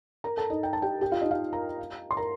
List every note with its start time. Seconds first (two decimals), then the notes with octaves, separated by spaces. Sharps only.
0.24 A#4 A#5
0.37 A4 A5
0.50 D#4 D#5
0.63 G5
0.73 A5
0.82 G4 G5
1.01 G4 G5
1.12 F4 F5
1.21 D#4 D#5
1.31 F4 F5
1.53 A#4 A#5
2.11 C6
2.17 A#4 A#5